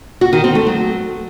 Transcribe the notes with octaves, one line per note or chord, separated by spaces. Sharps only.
F#4
D#3
C4
A3
F#3